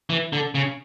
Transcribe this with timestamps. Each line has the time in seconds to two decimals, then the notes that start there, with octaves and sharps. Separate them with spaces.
0.10 E3
0.33 D3
0.55 C#3